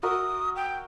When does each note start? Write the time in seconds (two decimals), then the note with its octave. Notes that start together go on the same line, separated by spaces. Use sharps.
0.03 F#4 A#4 E5 D#6
0.56 G5